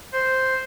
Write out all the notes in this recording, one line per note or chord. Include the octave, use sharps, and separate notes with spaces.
C5